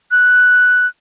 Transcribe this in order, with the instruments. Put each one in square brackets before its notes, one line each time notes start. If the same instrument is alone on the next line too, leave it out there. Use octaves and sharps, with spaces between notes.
[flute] F#6